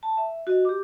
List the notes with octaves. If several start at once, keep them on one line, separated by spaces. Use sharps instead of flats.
A5
E5
F#4 D#5
G4 D6